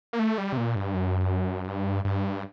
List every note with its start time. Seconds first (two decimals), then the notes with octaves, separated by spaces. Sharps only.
0.13 A#3
0.19 A3
0.38 G3
0.52 C3
0.57 A#2
0.76 G2
0.94 F#2
1.68 G2
2.05 G2